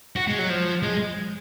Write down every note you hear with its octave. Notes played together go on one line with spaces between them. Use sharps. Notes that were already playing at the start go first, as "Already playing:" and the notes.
F#4
G#3
F#3
F3
G#3